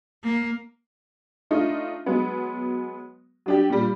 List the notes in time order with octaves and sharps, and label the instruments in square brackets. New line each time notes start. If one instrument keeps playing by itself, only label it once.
[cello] A#3
[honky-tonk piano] A3 D4 D#4 F4
F#3 G#3 B3
F#3 D4 G4
A#2 G3